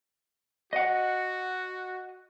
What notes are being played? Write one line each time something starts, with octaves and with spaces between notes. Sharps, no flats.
F#4 D#5 F#5